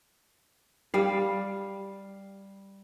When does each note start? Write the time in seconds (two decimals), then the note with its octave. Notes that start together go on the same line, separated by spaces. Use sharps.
0.94 G3 F5